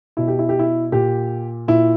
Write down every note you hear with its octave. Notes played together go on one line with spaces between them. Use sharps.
B2 E4
G4
E4
G4
E4
A#2 G4
A#2 E4